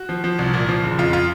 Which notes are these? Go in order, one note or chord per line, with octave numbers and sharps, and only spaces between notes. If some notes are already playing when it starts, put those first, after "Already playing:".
Already playing: F#4
F3
F3
C2
A#2
F3
F#1
F2 F4
F4